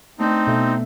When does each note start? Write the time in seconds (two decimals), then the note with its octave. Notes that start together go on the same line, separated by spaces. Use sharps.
0.19 A3 C4 D4 D#4 B4
0.47 B2 A4 E5